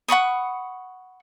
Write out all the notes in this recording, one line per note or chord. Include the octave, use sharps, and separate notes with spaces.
F#5 B5 C#6 D#6